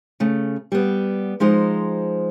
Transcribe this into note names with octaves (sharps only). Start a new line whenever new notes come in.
C#3 A3
G3 B3
F3 G#3 D#4 C5